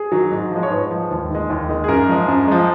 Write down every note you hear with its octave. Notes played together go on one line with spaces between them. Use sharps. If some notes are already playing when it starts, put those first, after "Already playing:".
Already playing: G#4
D#3 F#3
G#2
F3 G#3
C#5
G#2 B4
F3 G#3
D#2
D#3 G#3
D#2
D#3 G#3
G#4
F#2 A#4
F3 G#3
F#2
F3 G#3